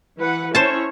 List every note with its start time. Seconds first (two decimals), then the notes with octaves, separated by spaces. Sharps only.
0.19 E3 B4 F#5
0.55 C#4 E4 C5 C#5 A5